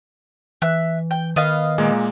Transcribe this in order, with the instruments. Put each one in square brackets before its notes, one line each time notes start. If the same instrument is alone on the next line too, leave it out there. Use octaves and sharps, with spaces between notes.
[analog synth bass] E3 [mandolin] E5 F#6
[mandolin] G5
[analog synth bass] D#3 [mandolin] B3 D#5 F5
[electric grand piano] A#2 G#3 A#3